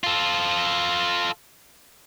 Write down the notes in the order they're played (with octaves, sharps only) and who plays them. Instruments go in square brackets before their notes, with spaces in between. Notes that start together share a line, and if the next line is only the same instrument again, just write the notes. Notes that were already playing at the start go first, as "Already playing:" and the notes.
[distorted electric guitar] F4 A4